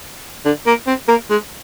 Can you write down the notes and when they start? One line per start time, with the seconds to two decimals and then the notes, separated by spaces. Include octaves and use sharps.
0.45 D3
0.66 A#3
0.87 C4
1.08 A#3
1.30 G#3